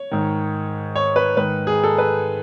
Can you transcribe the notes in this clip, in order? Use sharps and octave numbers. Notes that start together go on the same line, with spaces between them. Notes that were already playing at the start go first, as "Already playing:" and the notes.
Already playing: C#5
G#2 D#3
C#5
B4
G#2 D#3 B4
G#4
A4
B4